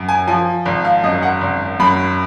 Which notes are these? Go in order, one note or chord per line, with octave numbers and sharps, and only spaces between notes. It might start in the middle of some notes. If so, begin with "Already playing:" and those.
Already playing: F#2
G#5
F3 G#5
G#1
F5
F#2 D#5
F#5
G#1
F#2 B5